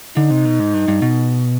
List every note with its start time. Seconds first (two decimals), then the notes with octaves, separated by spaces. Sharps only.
0.17 D3 D#4
0.31 C3
0.45 B2
0.60 G#2
0.74 G2
0.88 G2
1.02 B2